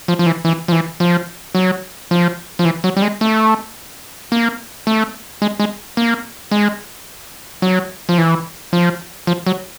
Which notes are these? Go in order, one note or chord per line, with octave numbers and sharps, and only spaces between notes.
F3
F3
E3
E3
F3
E3
F3
F#3
F3
F3
E3
F#3
G3
G#3
A3
A#3
A3
G#3
G#3
A#3
G#3
F#3
F3
E3
F3
F3
F#3